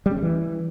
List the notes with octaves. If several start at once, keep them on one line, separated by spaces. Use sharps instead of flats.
G3
C#4
G#3
E3